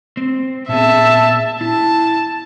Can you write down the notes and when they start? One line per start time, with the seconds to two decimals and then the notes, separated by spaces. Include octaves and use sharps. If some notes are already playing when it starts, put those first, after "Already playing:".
0.17 C4
0.69 A#2 B3 G#4 E5 A5
1.61 E4 A5